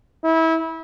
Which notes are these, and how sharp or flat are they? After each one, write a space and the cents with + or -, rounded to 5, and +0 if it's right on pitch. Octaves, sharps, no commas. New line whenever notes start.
E4 -25